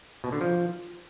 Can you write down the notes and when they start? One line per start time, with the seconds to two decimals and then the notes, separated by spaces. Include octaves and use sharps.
0.24 B2
0.32 D3
0.41 F3